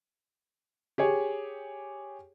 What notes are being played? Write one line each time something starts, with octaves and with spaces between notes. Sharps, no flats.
G4 G#4 C#5